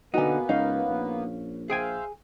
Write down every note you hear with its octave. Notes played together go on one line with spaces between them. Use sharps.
B2 D3 A#3 B3 D#4 F#4 B4 G#5
C#2 C#4 D#4 F5
A#1
G#4 C5 E5 F5 G5 G#5